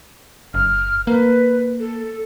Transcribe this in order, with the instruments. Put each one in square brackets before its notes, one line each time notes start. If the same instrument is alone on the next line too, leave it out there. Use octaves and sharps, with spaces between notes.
[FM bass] F#1 [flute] F6
[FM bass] A#3 [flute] B4
[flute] A4